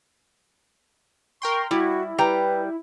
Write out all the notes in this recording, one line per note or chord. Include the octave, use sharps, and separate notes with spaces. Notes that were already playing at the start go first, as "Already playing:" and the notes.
A#4 G5 C6 C#6
G3 E4 F#4
G3 B4 G5 A#5